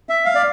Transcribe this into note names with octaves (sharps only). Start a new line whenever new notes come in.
E5
F5
D5